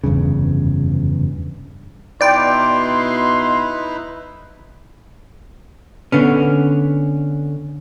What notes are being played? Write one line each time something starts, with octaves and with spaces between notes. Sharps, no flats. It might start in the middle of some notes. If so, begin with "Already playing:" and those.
F1 E2 G2 C#3
B2 D#4 E4 B4 D5 G5 C6
D3 B3 C#4